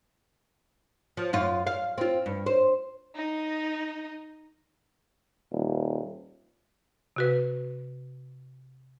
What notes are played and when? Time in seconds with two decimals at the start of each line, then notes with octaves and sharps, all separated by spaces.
1.17 F3
1.33 F#2 F4
1.67 F5
1.98 C4 F4
2.26 G2
2.46 C5
3.15 D#4 D#5
5.52 D#1
7.16 C3 F#4 B4